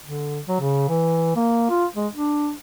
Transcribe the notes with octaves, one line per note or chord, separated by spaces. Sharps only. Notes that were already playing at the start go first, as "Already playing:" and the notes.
D3
F#3
C#3
E3
A#3
F4
G#3
D4